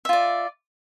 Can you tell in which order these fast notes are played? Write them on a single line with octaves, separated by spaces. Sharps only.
E5 F4 D5